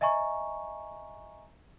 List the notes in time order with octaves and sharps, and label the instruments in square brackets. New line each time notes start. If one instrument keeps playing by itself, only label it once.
[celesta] D#5 E5 G#5 A#5 C#6